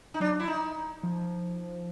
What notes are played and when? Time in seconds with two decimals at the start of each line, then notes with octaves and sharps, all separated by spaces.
0.14 D#4
0.20 F#3 D4
0.40 E4
0.47 D#4
1.03 F3